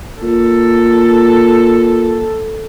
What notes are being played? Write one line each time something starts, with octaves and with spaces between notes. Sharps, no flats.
A#2 A4